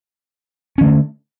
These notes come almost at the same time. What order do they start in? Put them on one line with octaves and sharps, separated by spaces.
C#4 E3 A3 D3